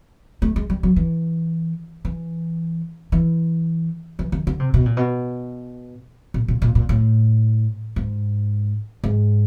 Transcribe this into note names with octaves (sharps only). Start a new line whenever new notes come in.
A3
G#3
G3
F#3
E3
E3
E3
E3
D#3
D3
C3
B2
A#2
B2
A#2
A#2
A#2
A#2
A2
G#2
G#2